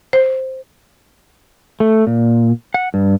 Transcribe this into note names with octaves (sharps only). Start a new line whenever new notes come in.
C5
A3
A#2
F#5
G2